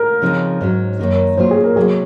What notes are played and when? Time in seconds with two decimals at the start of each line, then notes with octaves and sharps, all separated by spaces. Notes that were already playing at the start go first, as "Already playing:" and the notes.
Already playing: A#4
0.22 C#3 F3 C4 D#4
0.61 G#2 F#3 C#4
0.99 F#2 D#3 A#3 D#4
1.37 A#2 F#3 A#3 F4 C5
1.51 G#4
1.64 A#4
1.76 C3 F#3 A#3 G#4